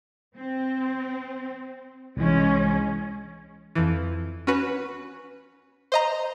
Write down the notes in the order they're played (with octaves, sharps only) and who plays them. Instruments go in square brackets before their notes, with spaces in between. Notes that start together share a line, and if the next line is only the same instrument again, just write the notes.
[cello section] C4
[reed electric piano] C2 E3 [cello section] G#3 C#4
[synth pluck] F2 E3
C#4 F#4 B4
C5 D#5 A#5